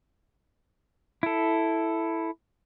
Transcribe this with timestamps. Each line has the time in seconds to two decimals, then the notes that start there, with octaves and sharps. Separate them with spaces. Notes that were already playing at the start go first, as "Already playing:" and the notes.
1.23 E4 A4